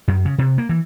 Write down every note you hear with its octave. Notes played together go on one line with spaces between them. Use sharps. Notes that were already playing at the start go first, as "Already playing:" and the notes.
F#2
C#3
C3
A#3
E3